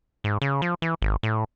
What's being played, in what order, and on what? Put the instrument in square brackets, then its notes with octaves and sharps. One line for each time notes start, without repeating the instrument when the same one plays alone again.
[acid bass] G#2
C#3
F3
E3
G#1
A2